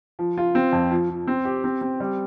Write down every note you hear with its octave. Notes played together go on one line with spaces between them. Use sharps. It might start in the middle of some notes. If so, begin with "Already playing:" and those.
F3
F4
C4
F2
F3
F3
C4
G4
C4
C4
G3